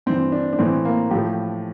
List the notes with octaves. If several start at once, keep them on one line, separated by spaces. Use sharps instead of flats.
G2 E3 C4
D4
D4
A2 E3 C4
A#3
A2 F3 G4